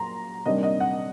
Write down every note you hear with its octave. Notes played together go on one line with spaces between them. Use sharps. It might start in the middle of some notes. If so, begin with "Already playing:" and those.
Already playing: A#2 F#3 A#5 C6
C3 D#3 G3 A#3 D4 D#5
D#5
F#5